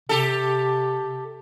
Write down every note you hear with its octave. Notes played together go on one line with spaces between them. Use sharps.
C3 G4 A4